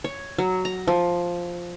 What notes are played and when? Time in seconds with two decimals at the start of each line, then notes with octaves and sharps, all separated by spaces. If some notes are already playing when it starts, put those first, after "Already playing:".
0.04 C#5
0.38 F#3
0.65 A#5
0.87 F3